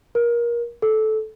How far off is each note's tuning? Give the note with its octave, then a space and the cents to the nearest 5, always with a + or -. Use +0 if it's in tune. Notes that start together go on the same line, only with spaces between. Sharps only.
A#4 +25
A4 -15